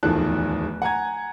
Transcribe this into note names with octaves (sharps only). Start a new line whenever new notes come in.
D1 E2 D#3 F3 A4 F#6
F#5 G#5 A#5 G#6